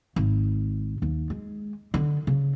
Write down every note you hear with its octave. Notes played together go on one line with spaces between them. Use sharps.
G#1
D#2
G#3
D3
C#3